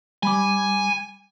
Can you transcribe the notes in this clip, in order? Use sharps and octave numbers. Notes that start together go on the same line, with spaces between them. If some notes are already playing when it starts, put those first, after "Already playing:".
G3 G#5 B5 D6